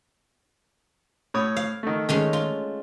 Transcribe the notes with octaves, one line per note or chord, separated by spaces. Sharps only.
A2 C#5 D#6
F5
D#3 A3
D#3 G#3 A3 C#4
F4